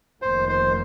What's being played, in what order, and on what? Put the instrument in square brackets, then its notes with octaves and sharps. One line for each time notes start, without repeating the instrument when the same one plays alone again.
[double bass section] F1 F2 D#3 A#3 [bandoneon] C5
[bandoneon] C5